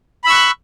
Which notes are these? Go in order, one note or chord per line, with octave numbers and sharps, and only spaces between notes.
B5 C#6 E6 F#6